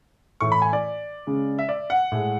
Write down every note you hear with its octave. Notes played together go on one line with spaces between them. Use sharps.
A2 E3 A3 C#6
B5
G#5
D5
C#3 G#3
E5
D5
F#5
A2 G#3